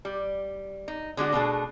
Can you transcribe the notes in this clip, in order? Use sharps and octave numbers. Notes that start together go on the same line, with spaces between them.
G3
D#4
D3 G#3 D4 F#4
B2 A3 D4 G#4